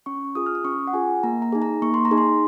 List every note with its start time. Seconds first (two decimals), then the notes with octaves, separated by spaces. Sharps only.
0.06 C#4 C#6
0.35 F4 G#4 D#6
0.46 F6
0.55 D#6
0.64 C#4 C#6
0.87 F#5
0.93 F4 G#4 G#5
1.23 A#3 A#5
1.42 A#5
1.52 D#4 G#4
1.62 A#5
1.82 A#3 C#6
1.94 C6
2.05 A#5
2.11 D#4 G#4
2.18 C6